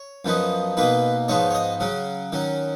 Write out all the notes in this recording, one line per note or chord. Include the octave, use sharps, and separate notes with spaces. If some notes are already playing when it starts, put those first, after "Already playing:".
Already playing: C#5
F#2 F3 B3 D#4
B2 A#3 D#4 B4
G#2 F3 B3 D#4 C#5
C#5
D#5
C#3 F#3 C#4
D#3 F#3 C#4